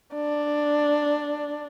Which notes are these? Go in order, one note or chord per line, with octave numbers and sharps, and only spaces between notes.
D4